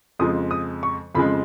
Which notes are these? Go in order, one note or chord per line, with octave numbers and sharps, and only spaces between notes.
F2 C#3 F3 G#3 D#6
D#6
C#6
F2 C#3 F3 G#3 B5